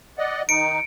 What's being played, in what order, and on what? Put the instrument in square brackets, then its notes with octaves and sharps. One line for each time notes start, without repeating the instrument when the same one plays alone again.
[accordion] D5 D#5 F#5
[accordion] D#3 D#4 [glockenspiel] C#7 D7